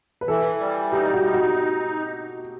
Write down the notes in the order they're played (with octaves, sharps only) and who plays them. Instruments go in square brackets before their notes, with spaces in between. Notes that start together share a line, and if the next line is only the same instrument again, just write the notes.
[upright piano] B4
[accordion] E3 [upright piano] A4
[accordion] G3
[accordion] D#4 [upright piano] G4
[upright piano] F#4
[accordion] D#4
[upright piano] F#4